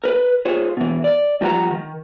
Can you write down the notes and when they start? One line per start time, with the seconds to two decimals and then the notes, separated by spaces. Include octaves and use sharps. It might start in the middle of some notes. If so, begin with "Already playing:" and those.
0.04 A#4 B4
0.45 F4 G#4 C5 C#5
0.77 B2 E3
1.04 D5
1.41 G2 F3 D#4 A#4 F#5 A#5
1.71 D#3